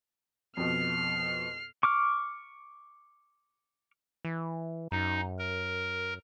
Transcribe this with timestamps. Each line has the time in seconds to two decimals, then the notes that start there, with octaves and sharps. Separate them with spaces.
0.57 F2 B2 F6 C7
1.83 C#6 D6 F6
4.25 E3
4.92 F#2 D#4
5.39 A#4